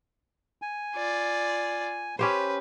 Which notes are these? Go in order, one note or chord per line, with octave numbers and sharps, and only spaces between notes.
G#5
F4 D5
C#4 G4 B4 C5